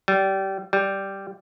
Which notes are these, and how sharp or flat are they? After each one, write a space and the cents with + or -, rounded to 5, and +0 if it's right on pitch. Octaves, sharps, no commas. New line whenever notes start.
G3 -25
G3 -5